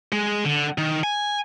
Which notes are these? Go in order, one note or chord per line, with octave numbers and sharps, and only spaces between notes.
G#3
D3
D#3
G#5